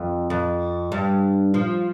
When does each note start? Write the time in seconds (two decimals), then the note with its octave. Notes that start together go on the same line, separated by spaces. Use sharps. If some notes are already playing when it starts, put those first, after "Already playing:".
Already playing: F2
0.30 F2
0.92 G2
1.54 F3